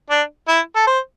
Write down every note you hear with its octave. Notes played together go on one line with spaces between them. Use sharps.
D4
E4
A4
C5